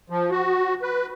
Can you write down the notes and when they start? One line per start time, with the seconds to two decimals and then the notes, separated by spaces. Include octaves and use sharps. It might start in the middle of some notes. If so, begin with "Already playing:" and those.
0.10 F3
0.31 F#4
0.82 B4